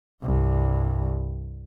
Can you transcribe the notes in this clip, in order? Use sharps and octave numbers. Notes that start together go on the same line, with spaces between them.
C2 G2